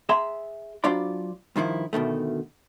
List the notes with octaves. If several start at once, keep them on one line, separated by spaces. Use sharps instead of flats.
G#4 E5 A#5 C6
F#3 D4 F4 C5 D5 B5
G2 D#3 F3 E4
D2 B2 D#3 A3